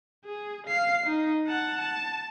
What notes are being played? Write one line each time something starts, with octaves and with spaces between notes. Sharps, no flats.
G#4
F5 C7
D#4
F#5 A5
A5